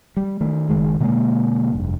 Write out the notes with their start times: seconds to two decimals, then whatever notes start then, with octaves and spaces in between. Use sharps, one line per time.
0.17 G3
0.41 D#3 A3
0.69 F#1 D#3 G#3
1.00 B2 D3 G#3 A#3
1.72 F1 G2